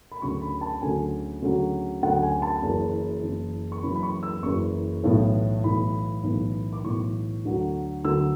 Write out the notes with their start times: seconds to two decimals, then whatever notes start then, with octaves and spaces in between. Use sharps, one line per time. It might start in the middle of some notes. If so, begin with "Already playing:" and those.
0.12 B5
0.21 D2 C#3 F#3 C#6
0.42 B5
0.61 A5
0.82 D2 C#3 F#3 G#5
1.42 D2 C#3 F#3
2.02 D2 C#3 F#3 F#5
2.22 G#5
2.42 A5
2.63 F#1 F#2 E3
3.22 F#1 F#2 E3
3.72 C#6
3.83 F#1 F#2 E3 B5
3.96 B5
4.03 C#6
4.23 E6
4.43 F#1 F#2 E3 C#6
5.04 B1 A2 E3
5.64 B1 A2 E3 B5
6.24 B1 A2 E3
6.73 D6
6.84 B1 A2 E3 C#6
7.45 D2 D3 F#3
8.04 D2 D3 F#3 E6